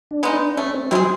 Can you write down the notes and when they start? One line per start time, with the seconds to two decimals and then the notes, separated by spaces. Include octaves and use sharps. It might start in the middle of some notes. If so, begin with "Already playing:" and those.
0.11 D4
0.23 G#3 B3 D#4
0.33 D4
0.57 A3 C#4
0.68 C#4
0.74 C4
0.91 F#3 C4 E4
0.95 G#4